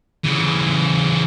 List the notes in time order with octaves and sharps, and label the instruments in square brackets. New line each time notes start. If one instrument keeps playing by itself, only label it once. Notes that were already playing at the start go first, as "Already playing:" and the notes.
[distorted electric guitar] C#3 E3